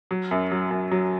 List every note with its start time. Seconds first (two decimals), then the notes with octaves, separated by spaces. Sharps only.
0.11 F#3
0.31 F#2
0.51 F#3
0.71 F#2
0.91 F#3